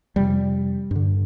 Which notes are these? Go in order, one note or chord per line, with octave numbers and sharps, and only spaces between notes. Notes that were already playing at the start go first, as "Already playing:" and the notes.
F2 C3 G3
G2 D3